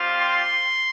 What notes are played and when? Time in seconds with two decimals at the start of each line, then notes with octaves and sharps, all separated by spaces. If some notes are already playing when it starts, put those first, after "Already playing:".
Already playing: G3 C4 F4
0.20 C6